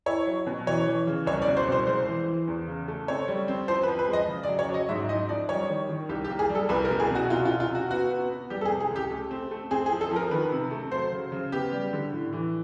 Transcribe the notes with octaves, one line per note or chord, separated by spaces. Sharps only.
E4 C#5
F#3
B2
E3 C#5
E3
C#3
C2 C#5
D5
B2
C5
C2 C5
G#3 C5
E3
E3
E2
C#3
A3
C4 C#5
G3
C4
F3 C5
B4
F3
B4
G#3
D#5
C#3
D5
F#3
C#5
F#3
D#5
G#2 E5
D#4 D#5
F3 D5
G3 C#5
D#3
D#3
C2 G4
G4
A#3
G#4
G3
A4
C2 B4
A#4
B2
G#4
B2 F#4
C3 F4
F4
C3
F4
C3 F#4
B3 F#4
B3
B3
G3 G4
A4
G#4
C3
G#4
C#2
G4
A3
C4
A3
C4 G#4
G#4
F3
A4
F3 A#4
D#3 B4
C3
A3
F#3 C5
C#3
C#3
B3 G4
G3
D3
A2
E3